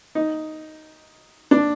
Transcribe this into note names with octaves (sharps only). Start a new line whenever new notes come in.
D#4
D4